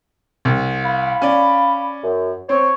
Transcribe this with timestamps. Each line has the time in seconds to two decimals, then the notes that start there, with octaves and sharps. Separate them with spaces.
0.45 C2
0.84 F5 B5
1.22 C#4 D5
2.03 F#2
2.49 C4 C#5